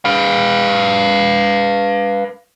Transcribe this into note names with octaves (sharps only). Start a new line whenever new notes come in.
B4 F5